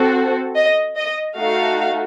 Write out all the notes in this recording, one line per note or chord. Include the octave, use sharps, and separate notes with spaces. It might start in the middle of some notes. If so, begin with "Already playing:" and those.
Already playing: C4 F#4 A4
D#5
D#5
A3 D#4 F#4 F5